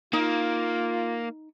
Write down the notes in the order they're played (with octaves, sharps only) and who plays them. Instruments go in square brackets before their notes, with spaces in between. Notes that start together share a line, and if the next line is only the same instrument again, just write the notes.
[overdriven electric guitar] A#3 [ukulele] D#4 [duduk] F4